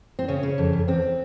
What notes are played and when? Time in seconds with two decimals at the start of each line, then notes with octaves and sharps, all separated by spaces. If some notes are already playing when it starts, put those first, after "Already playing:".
0.19 C4
0.28 C#3 C#4
0.43 C#3
0.58 F2
0.73 F2
0.88 E2 C4